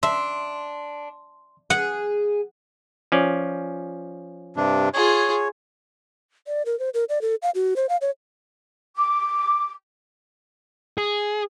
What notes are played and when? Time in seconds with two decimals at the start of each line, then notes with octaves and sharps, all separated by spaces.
0.03 D4 E5 C6
1.70 G#4 F#5
3.12 F3 C#4 D5
4.56 G2 C3 D4
4.94 F4 G#4 C#5
6.47 D5
6.66 A#4
6.79 C5
6.94 A#4
7.09 D5
7.22 A4
7.42 F5
7.55 F#4
7.76 C5
7.89 F5
8.01 C#5
8.96 D6
10.98 G#4